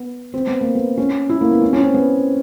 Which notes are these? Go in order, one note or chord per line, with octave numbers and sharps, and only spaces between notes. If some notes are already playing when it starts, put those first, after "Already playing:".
Already playing: B3
C4
B3
A#3
B3
C#4
E4
A#3
B3
C#4
C#4
C4
B3